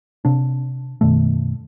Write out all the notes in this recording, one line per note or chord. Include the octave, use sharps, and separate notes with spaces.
C3 D4
F#2 B2 D#3 A3